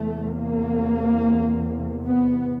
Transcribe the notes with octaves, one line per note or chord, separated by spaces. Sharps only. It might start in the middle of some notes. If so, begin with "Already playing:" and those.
Already playing: E2 C3 A3
A#3
B3